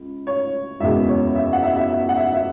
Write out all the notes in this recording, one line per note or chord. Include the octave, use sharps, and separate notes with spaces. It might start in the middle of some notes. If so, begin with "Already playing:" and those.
Already playing: C#2
C#5
F#1 E2 B2 G#3 E5
C#5
E5
F#5
E5
E5
E5
F#5
E5
E5